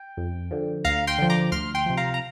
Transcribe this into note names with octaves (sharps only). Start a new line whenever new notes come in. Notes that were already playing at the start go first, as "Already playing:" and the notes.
Already playing: G5
F2
D3 F3
D2 F5 A#5
G5 C6
D3 F3
A#5 D6
D2 C6 F6
G5 C6
C3 F3
F5 A#5
A#5